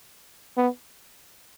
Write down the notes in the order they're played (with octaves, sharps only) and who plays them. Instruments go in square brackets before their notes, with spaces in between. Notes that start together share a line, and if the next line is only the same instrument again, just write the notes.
[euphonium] B3